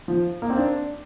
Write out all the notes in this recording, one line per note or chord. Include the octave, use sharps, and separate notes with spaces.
F3
A#3
C4
D4